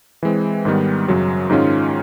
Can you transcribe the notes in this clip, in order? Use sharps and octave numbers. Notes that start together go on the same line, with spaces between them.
E3 G#3 C4
G#2 D#3 G3 B3
F#2 C#3 F#3
G#2 D#3 G#3 C#4 F4